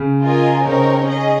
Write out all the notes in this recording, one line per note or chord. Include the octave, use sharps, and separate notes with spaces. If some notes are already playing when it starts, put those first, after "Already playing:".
Already playing: C#3
F4 A#4 D#5 G#5
C#3 C4 D#4 A#4 C#5
C#4 G#4 D#5